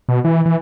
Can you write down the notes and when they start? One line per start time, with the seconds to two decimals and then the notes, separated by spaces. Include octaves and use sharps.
0.09 B2
0.24 E3
0.46 E3